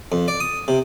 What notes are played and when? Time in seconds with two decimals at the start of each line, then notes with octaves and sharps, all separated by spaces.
0.12 F2
0.28 D5
0.40 D#6
0.68 C3